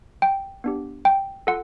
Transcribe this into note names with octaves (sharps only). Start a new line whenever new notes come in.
G5
B3 D4 G4
G5
F4 A4 F#5